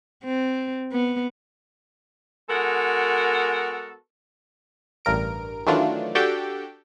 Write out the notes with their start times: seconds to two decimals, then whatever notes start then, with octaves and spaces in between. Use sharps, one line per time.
0.24 C4
0.92 B3
2.50 G#3 B3 F#4 A4 A#4
5.05 A1 G2 A#4 D7
5.67 D#3 E3 F#3 A3 D4 F4
6.15 D4 F#4 G4 A4 G5